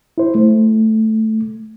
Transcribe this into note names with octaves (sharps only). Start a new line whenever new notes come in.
E4 C5
A3